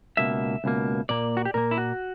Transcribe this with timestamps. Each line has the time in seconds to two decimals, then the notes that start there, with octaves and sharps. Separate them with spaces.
0.17 C#2 B2 A#3 E5
0.64 C#2 B2 A#3
1.09 A#2 A#3 D5
1.37 F#4
1.45 G4
1.54 A#2 A#3 A#4
1.71 E4
1.78 F#4